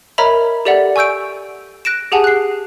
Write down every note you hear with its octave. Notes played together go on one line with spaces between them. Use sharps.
A#4 C#5 D#5 E5 A#5 B5
G4 A4 D5 E5 F#5
G#5 C#6 E6 G6 D7
F#6 A#6 D7 E7
G4 G#4 F#5 G#5 A5
F#6 C7